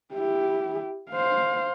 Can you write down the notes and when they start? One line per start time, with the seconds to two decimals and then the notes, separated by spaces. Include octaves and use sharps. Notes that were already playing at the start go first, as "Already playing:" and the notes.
0.14 E4 G4
1.10 C5 F5